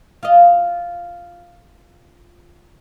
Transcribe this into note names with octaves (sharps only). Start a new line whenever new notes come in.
F4 D#5